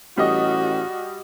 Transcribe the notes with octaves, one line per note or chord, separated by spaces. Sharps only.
A1 G3 F#4 D#5